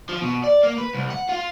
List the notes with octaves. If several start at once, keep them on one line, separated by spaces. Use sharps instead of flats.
F3
B2
D5
A#3
B4
C2
F#5
F4